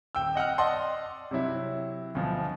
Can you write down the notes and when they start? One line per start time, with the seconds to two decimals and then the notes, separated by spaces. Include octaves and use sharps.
0.15 D#1 G5 E6
0.35 D#5 F#5 G5 F6
0.58 D5 D#5 F#5 A5 C6
1.31 C3 F#3 E4
2.15 D2 B2 F3